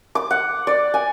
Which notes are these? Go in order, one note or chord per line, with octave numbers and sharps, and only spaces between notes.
D6
F#5
D5
G#5